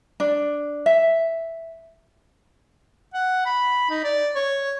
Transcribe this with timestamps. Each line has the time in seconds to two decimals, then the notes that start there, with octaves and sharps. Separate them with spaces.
0.20 D4
0.86 E5
3.14 F#5
3.45 B5
3.90 D#4
4.04 D5
4.35 C#5